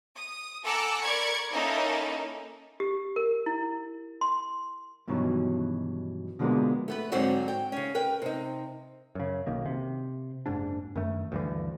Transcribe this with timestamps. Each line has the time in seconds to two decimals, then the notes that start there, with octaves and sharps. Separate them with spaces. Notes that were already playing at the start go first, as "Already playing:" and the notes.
0.15 D#6
0.64 A4 F#5 G#5 A#5 D6 E6
1.01 A#4 D5 B5 C#6 G#6 C#7
1.51 A#3 C#4 D#4 E4 A4
2.80 G4
3.16 A#4
3.46 E4
4.21 C6
5.08 G2 B2 D#3 E3 F#3 C#4
6.39 B2 D3 F3 G#3 A#3 B3
6.88 A3 B3 B4
7.12 G#2 D3 F#3 C4 D#4 F#4
7.48 G5
7.72 C#3 C#4
7.95 A#4 B4 G5
8.22 C3 D#4
9.15 F#2 C#3
9.46 B1 D#3 A#3
9.66 C3
10.46 F#1 G#2 D4
10.96 F#2 D#3 A3
11.32 D2 G2 E3